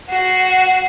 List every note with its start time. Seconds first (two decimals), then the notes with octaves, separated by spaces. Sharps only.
0.10 F#4 C7